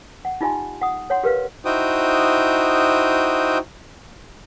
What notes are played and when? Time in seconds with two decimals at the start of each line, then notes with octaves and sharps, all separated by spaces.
0.25 F#5
0.41 D#4 F4 G4 D#5 G#5 C6
0.81 F#5 D#6
1.10 C#5 F#5 C6
1.24 G4 A#4 B4 F5
1.65 D#4 E4 F#4 C5 G5 D#6